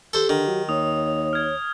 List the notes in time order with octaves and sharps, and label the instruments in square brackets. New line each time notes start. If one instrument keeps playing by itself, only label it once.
[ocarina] G4 [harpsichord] A4 C5
[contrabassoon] D3 [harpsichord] D#3
[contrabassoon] F#3
[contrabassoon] D#2 [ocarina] C#5 [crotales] D#6
[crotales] F6 G#6